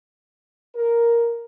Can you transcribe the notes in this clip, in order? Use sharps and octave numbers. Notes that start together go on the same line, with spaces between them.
A#4